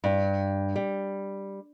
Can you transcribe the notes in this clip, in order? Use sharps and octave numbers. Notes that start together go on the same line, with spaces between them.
G2
G3